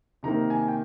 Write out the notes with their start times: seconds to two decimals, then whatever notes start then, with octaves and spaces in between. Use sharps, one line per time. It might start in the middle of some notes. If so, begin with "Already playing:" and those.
0.23 C3 D#3 A#3 A#5
0.50 G#5
0.68 G5